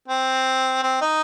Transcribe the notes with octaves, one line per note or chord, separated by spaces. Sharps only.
C4
C4
D#4